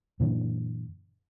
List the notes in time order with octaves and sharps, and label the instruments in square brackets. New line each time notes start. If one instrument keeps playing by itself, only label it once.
[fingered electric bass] F#2 A#2 D3 E3